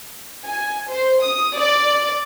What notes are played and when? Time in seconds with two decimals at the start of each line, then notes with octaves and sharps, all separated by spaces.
0.46 G#5
0.90 C5
1.22 D#6
1.58 D5